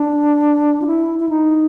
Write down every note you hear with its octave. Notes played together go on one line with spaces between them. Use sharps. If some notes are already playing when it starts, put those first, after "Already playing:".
Already playing: D4
F4
E4
E4
D#4